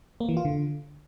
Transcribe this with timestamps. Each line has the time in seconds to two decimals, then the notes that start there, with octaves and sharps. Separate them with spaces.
0.20 A#3
0.29 E3
0.37 F4
0.45 D3